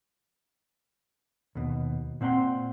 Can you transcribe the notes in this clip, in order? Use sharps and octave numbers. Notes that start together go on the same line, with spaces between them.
D#2 B2
A#2 C4 F#5 B5 C6